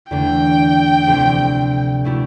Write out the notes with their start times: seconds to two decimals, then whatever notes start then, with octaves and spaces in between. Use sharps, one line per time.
0.11 E2 D3 A3 D4 G5
1.07 D2 C3 F3 C4 G4
2.04 B2 A3 E4 G4